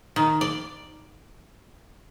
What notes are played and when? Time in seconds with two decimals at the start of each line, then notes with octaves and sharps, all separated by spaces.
0.16 D#3
0.41 D5